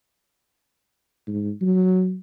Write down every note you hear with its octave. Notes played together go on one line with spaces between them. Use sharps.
G#2
F#3